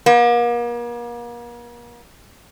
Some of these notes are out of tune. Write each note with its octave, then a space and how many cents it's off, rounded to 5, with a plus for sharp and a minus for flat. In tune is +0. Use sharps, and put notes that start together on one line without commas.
A#3 +40